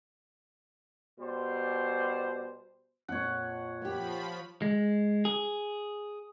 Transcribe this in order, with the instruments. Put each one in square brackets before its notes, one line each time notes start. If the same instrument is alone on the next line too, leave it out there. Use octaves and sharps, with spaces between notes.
[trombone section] B2 G3 C5
[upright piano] F2 A#2 [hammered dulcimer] C#5 F#5
[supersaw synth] F3 B5 [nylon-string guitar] A#3 G4
[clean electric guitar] G#3
G#4